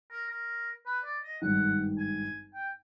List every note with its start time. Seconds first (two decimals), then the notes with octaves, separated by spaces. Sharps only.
0.11 A#4
0.29 A#4
0.86 B4
1.04 D5
1.23 D#5
1.42 G#1 G2 D#3 F#5
1.98 G#5
2.55 G5